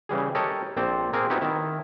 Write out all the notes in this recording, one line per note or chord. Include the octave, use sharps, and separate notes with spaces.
C#3 E3 G3 G#4
G4 A4 A#4 C#5 D#5
A#1 C4 C5 D5
A#3 C4 G#4 A#4
B3 D#4 E4 F#4 G4
D#3 E4